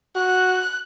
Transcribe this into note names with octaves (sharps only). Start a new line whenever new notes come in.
F#4 F#6